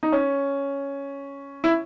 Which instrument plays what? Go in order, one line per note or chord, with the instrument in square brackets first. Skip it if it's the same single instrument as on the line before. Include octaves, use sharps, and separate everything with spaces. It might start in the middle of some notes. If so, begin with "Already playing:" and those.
[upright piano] D#4
C#4
E4